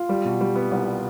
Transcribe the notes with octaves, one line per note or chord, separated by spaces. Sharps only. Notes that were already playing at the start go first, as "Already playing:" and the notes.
Already playing: F4
G3
B2
G3
B3
C2